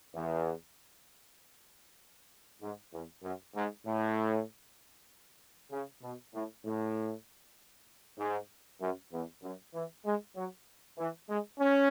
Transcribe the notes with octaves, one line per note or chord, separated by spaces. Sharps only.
E2
G#2
E2
F#2
G#2
A2
C#3
B2
A2
A2
G#2
F#2
E2
F#2
E3
G#3
F#3
E3
G#3
C#4